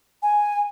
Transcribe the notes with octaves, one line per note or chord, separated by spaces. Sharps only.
G#5